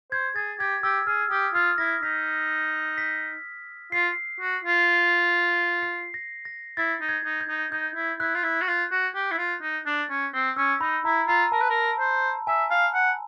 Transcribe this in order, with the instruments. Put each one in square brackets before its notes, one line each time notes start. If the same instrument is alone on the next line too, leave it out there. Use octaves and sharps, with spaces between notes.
[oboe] C5 [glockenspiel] G#6
[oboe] G#4 [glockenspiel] A6
[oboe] G4 [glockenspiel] G#6
[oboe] G4 [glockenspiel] E6
[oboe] G#4 [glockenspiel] F6
[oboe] G4 [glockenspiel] D#6
[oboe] F4 [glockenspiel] F6
[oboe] E4 [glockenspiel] A#6
[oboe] D#4 [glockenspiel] B6
[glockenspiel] B6
[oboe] F4 [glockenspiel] C7
[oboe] F#4
F4
[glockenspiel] C7
A#6
A#6
[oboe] E4 [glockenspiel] A6
[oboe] D#4
[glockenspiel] G#6
[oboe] D#4
[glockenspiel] G6
[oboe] D#4
[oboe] D#4 [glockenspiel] G6
[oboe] E4
[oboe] E4 [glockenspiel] F#6
[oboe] F4
E4
F#4
F4
F#4
G4
E4
F4
D#4
D4
C#4
C4
[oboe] C#4 [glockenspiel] E6
[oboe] D#4 [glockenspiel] B5
[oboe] E4 [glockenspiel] A#5
[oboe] F4 [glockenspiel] A#5
[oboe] A#4 [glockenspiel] A5
[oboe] B4
A#4
C5
[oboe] E5 [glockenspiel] G#5
[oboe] F5
F#5